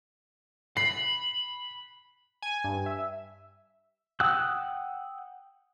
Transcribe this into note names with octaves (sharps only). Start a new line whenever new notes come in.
B5 C7
G#5
G2
E5
F#5 G5 D#6 E6 F#6